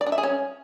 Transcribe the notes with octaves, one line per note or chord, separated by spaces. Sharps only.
D5
D4
E5
G#4
C#4